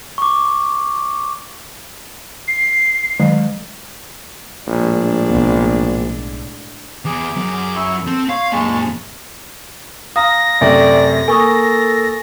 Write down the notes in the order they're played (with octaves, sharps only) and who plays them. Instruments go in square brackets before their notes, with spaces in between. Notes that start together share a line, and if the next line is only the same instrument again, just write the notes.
[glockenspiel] C#6 D6
[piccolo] C7
[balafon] D#3 F#3 G#3
[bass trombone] A#1 [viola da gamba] A2 G#3 D4
[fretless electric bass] B1 B3
[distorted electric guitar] E2 [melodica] G#4 D6
[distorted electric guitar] F#2
[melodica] E4 C#6
[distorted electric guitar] C4 [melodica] A4
[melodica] C#5 C6 [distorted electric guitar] F5
[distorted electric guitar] F#2 A#2 [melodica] G#3 A5 C#6
[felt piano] F5 [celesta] A#5 D#6 [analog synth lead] A#6
[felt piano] F#2 C3 A3 [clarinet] D5
[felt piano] A#3 [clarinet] A4 [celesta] G#5 C#6 D#6